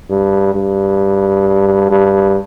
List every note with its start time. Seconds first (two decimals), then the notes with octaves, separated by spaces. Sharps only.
0.10 G2
0.55 G2
1.91 G2